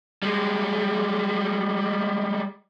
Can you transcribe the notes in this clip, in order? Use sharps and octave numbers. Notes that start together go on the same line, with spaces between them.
G3 G#3